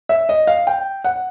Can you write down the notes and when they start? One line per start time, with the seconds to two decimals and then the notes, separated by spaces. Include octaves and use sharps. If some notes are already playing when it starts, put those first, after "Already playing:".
0.09 E5
0.29 D#5
0.47 F5
0.67 G5
1.04 F#5